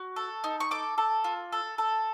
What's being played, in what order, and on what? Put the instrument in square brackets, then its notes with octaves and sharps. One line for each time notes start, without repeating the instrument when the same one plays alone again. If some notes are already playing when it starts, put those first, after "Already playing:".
Already playing: [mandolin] F#4
A4
D#4
C#6
A4 D6
A4
F4
A4
A4